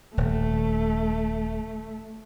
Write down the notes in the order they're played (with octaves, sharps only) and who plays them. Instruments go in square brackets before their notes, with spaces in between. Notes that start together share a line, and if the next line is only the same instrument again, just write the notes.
[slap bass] D#1 [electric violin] A3